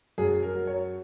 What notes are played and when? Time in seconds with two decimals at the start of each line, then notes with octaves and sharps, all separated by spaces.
0.18 F#2 G#4
0.43 A#4
0.55 F#3
0.67 C#5